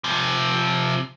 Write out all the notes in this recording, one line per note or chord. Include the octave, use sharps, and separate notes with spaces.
C3 F3